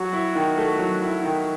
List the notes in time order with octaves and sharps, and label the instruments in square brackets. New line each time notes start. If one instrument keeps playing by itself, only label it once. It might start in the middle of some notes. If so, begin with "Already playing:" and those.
Already playing: [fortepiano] F#3 [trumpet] F#4
[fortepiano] E4
D#3
A3
F#3
E4
D#3